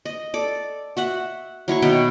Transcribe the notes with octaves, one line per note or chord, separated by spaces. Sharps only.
D#5
A4 D5
F#4 E5 F#5
F#3 E4 C#5 C#6
B2 D#3 B4 G5